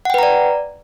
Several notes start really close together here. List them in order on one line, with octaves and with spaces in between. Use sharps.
F#5 G5 B4 A#5 D5